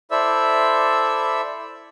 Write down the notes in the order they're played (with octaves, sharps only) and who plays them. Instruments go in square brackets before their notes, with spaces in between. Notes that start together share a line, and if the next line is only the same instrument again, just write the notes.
[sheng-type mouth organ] E4 A4 C5 D5 E5 E6